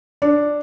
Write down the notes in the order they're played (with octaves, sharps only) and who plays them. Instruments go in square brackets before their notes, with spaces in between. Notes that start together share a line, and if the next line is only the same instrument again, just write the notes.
[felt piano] D4